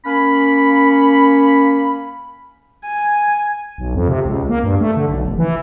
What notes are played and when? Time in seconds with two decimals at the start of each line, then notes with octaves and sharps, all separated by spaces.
0.06 A#3 C#4 B5
2.85 G#5
3.78 B1
3.95 F2
4.09 C3
4.25 C#2
4.49 A#3
4.64 G2
4.81 A3
4.97 D3
5.09 B1
5.25 F1
5.38 E3